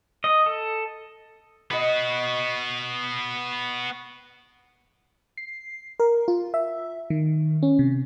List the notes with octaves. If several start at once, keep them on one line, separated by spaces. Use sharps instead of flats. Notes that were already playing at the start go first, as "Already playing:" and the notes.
D#5
A4
B3 F#4 D#5 B5
C7
A#4
F4
E5
D#3
C#4
C3